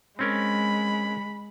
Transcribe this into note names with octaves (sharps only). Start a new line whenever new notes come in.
G#3 C4 C#4 A#4 B5